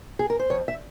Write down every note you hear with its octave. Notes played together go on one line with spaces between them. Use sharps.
G#4
A#4
C5
F2 C#5
E5